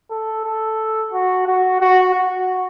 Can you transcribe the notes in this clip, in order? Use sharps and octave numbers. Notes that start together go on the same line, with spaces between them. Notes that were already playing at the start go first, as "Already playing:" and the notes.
A4
A4
F#4
F#4
F#4
F#4